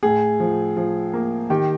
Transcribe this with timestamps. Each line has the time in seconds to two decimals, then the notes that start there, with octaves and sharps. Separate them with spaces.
0.03 A2 G#4
0.40 F3
0.77 F3
1.14 A#3
1.50 D#3 G4